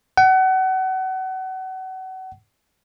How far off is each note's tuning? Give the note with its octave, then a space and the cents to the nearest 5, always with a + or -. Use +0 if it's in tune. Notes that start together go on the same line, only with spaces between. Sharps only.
F#5 +30